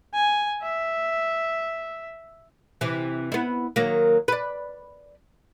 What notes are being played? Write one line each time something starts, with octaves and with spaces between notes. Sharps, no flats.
G#5
E5
C3 E3
B3 E4
D#3 F#3 A#3
B4 D5